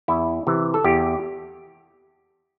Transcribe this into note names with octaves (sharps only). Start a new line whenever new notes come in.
E2 E4
C3 E3
A4
E2 G4